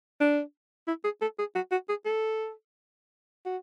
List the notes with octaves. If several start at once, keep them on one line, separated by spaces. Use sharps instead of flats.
D4
E4
G#4
A4
G#4
F#4
F#4
G#4
A4
F#4